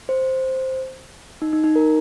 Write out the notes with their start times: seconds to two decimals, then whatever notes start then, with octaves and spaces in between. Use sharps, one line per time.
0.09 C5
1.42 D#4
1.53 D#4
1.64 D#4
1.76 A#4